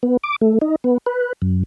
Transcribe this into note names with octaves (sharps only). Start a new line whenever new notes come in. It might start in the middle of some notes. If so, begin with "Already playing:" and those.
B3
D6
A3
D#4
B3
B4
F#2